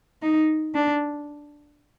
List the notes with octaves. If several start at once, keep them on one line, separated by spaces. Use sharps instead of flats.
D#4
D4